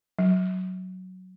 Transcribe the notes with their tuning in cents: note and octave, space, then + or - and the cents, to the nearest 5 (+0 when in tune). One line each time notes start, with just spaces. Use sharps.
F#3 +0